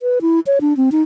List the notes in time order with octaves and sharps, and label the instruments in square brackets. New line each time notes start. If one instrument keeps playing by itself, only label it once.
[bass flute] B4
E4
C#5
D4
C4
D#4